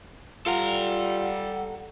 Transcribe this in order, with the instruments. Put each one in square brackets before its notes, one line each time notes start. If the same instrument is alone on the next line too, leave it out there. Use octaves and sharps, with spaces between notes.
[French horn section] G3 [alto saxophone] F4 [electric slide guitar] A4 A#5 [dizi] F#5